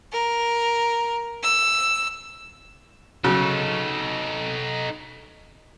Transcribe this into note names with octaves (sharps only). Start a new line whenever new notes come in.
A#4
E6
C#3 F#3 D#4 A4